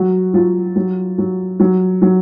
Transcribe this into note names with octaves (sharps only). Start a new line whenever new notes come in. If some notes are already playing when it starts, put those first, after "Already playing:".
Already playing: F#3 F#4
F#3 F4
F#3
F#3
F#3
F#3